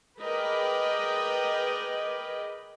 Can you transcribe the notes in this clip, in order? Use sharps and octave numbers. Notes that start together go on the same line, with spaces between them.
G#4 A#4 B4 D5 D#5 G5